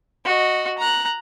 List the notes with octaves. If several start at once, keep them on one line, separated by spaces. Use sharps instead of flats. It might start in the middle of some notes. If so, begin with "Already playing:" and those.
F#4 D#5
A#5 F#6